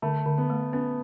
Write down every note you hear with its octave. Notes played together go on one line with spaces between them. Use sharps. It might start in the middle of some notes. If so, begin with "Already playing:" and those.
D3 A3
D3
B3
A3
B3 C#4